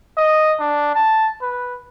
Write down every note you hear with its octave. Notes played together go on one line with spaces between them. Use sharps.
D#5
D4
A5
B4